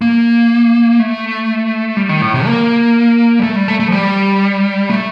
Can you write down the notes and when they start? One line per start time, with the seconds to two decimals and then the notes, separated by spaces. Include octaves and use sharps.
0.01 A#3
1.00 A3
1.97 G3
2.09 D#3
2.21 A2
2.34 C3
2.46 A#3
3.39 G3
3.43 A3
3.56 G3
3.68 A3
3.80 A3
3.88 F3
3.92 G3
4.90 A3